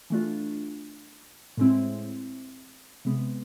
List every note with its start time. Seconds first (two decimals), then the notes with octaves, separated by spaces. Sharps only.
0.10 E3 A3 D4 F4
1.57 A2 G#3 C4 E4
3.05 C3 G#3 B3